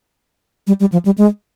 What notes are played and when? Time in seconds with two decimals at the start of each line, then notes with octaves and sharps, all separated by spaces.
0.67 G3
0.80 G3
0.92 F3
1.05 G3
1.18 G#3